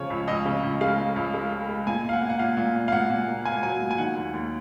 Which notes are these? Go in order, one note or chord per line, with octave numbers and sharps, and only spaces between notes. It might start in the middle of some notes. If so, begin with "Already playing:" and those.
Already playing: C#3 F3 C#5
C#2
C#2 D#5
C#3
C#2
G#3 F5
G#3
C#2
G#3
G#3
G#3
A#2 G#5
A#2 F5
F#5
A#3
F#5
A#2 F5
A#2
A#2
F5
A#2 F#5
A#2
A#3
A#3 G#5
F#3 G#5
A#2
G#5
D#3 F#5
D#2
D#2